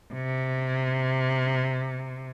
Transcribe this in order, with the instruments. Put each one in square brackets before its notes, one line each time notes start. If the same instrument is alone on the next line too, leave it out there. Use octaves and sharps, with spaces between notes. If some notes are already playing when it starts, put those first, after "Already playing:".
[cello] C3